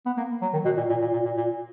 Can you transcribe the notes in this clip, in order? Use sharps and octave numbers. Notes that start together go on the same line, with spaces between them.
B3
A#3
F#3
D#3
B2
A#2
A#2
A#2
A#2
A#2
A#2